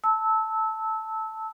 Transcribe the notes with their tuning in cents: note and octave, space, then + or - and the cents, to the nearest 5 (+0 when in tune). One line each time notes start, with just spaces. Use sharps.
A5 +0 E6 -20